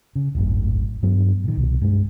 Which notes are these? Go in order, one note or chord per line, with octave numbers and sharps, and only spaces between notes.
C#3
D1 G#1 F#2 A2
G2 F#3 B3
A#2 D#3
C2 B2
G2 G#3